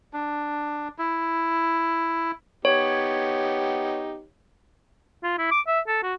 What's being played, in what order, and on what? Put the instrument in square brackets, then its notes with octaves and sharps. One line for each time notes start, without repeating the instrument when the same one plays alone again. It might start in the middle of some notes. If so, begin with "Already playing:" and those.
[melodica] D4
E4
[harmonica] B3 D#4 G4 [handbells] C#5
[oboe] F4
E4
D6
E5
A4
F#4